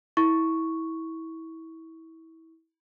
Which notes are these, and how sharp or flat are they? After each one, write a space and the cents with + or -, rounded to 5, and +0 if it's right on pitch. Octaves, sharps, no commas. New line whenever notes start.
E4 -25 C#6 +0